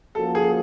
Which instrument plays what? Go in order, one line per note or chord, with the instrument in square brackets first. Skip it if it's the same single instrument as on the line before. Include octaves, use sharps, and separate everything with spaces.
[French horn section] F3 A#3 C#4 F#4 [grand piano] A4
[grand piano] G#4